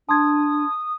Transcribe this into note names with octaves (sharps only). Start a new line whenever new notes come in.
D4 A5 C6 D#6 G#6